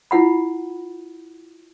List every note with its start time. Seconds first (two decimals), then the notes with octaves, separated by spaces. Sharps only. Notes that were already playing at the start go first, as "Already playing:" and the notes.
0.11 E4 F4 F#5 B5